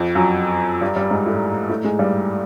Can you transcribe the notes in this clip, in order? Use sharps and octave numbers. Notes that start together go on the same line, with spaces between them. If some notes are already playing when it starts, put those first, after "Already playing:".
Already playing: F2 F3
F#2 F#3
G2 G3
G2 G3
G#2 G#3
A2 A3
A2 A3
G#2 G#3
G2 G3